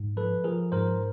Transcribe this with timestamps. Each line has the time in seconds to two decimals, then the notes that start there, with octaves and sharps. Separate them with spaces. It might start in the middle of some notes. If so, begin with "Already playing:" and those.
Already playing: G#2
0.17 F3 A4 B4
0.44 F3 G#4 A#4
0.72 G#2 A#4 C5